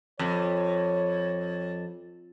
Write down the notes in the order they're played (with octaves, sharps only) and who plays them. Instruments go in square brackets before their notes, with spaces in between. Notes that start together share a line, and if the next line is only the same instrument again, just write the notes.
[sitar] F2 [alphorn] C#5